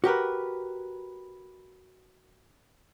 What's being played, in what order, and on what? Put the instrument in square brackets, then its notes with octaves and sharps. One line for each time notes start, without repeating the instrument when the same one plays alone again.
[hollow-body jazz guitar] F#4 G4 A#4 B4